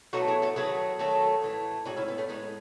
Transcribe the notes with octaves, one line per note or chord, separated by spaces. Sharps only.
B2 F#3 A3 D#4 F#4
E4 G#4
F#4 A4
D#3 F#3 A3 G#4 B4
D#3 F#3 A3 F#4 A4
A2 E3 A3
A2 E3 G#3 D#4 F#4
C#4 E4
B3
A3 C#4
A2 G#3 B3 D#4